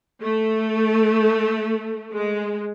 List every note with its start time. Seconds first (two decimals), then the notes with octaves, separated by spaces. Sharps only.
0.22 A3
2.13 G#3